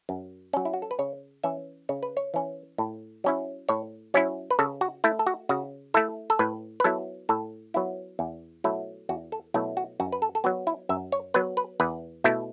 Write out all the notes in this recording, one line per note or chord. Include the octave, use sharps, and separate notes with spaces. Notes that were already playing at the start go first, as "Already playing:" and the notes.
F#2
F#3 C#4
E4
F#4
A4
B4
C#3 C#5
E3 C#4 E5
C#3 C#5
B4
C#5
E3 C#4
A2
F#3 C#4 E4
A2 C#5
F#3 C#4 E4 C#5
B4
C#3 A4
F#4
A3 E4
A4
F#4
C#3 F#4
A3 E4 A4
A4
A2 B4
B4
F#3 B3 E4 A4
A2 A4
F#3 B3 E4
E2
B2 F#3 A3 E4
E2 F#4
A4
B2 F#3 A3 E4
F#4
F#2 F#4
B4
A4
A4
F#3 B3 F#4
E4
F#2 E5
C#5
F#3 B3 B4
B4
E2 B4
B2 A3 E4